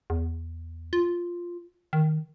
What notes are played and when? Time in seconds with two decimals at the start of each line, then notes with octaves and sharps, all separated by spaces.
0.10 E2
0.93 F4
1.93 D#3